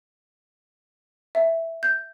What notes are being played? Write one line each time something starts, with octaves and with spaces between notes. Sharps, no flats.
E5
G6